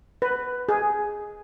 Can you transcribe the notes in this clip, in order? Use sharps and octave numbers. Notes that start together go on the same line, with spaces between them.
B4
G#4